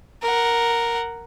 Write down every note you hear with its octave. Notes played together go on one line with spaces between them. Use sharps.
A#4 F#5